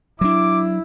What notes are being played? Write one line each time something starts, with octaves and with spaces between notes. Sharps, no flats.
F#3 D4 E4 D6